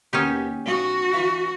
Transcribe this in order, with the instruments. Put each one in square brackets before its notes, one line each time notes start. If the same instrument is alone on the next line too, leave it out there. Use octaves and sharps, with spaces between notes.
[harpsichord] D#2 B2 [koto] C#4 D#4 G4
[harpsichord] B1 F4 D#6 [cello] F#4
[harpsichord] E3 F4 B4